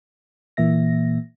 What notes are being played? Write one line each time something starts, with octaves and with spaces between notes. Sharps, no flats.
A#2 E3 A#3 E5 A#6